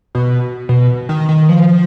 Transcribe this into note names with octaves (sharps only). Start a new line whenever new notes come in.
B2
B2
D#3
D#3
F3